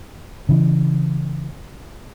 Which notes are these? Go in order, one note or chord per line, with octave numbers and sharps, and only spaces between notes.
C#3 E3